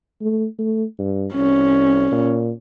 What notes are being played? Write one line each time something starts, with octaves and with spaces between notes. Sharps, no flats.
A3
A3
G2
C2 C#4
A#2